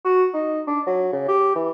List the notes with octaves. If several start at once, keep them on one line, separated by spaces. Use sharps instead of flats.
F#4
D#4
D4
F#3
C#3
G4
E3